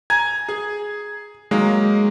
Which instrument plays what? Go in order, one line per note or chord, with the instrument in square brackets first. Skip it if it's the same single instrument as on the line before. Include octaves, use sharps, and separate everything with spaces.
[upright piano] G#5 A#5 [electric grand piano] G#6
[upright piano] G#4
[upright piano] D#3 F#3 A#3 [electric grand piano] G#3